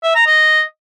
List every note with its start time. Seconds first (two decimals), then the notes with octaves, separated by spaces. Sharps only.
0.03 E5
0.15 A#5
0.27 D#5